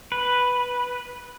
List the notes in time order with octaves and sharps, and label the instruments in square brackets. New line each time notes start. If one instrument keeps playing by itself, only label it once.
[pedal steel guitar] B4